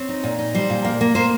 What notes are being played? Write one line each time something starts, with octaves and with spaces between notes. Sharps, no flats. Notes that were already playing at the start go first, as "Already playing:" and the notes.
Already playing: C4 C#5
D#4
A#2
D#4
G3 C5
A#2
A#3
A#3
A#3 C5